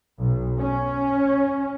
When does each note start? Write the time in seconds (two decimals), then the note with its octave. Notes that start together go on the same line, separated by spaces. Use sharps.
0.19 B1
0.60 C#4